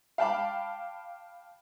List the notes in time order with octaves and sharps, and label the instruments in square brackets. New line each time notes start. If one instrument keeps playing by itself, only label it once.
[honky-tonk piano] F5 G5 A5 B5 D6